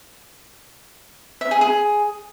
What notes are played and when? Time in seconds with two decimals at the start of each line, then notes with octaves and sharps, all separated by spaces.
1.41 E5
1.51 G#4
1.61 G#4